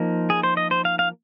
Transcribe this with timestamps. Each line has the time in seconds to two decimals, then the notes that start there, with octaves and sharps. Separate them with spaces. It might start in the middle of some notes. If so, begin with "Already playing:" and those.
Already playing: F3 A#3 D#4
0.30 G#4
0.43 C5
0.57 D#5
0.71 C5
0.85 F5
0.99 F5